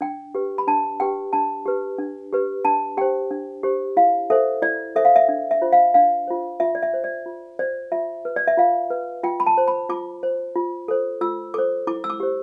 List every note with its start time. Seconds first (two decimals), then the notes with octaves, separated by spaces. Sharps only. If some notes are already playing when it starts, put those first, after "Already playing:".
0.01 D4 G5
0.35 G4 B4
0.58 B5
0.68 D4 A5
1.00 G4 B4 G5
1.33 D4 A5
1.66 G4 B4
1.98 D4
2.33 G4 B4
2.65 D4 A5
2.97 G4 C5 G5
3.31 D4
3.63 G4 C5
3.97 E4 F5
4.30 A4 C5 E5
4.62 E4 D5
4.96 A4 C5 E5
5.05 F5
5.16 E5
5.29 D4
5.51 E5
5.62 F4 C5
5.73 F5
5.94 D4 F5
6.27 F4 C5
6.60 F4 E5
6.75 D5
6.82 E5
6.94 C5
7.04 D5
7.26 F4
7.59 C5 D5
7.92 F4 E5
8.25 B4
8.36 D5
8.47 E5
8.57 F4 F5
8.90 B4
9.23 F4 G5
9.40 B5
9.47 A5
9.58 C5
9.68 B5
9.89 F4 D6
10.23 C5
10.56 F4
10.88 A4 C5
11.21 F4 E6
11.54 A4 C5 D6
11.87 E4 D6
12.04 E6
12.10 D6
12.20 G4 C5